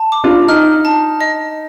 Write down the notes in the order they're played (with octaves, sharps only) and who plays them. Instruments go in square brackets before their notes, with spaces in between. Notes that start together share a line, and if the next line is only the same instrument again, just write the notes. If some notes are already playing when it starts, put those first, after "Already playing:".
Already playing: [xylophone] A5
D6
[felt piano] D4 F4
[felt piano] D#4 [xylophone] F6
[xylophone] A5
D#5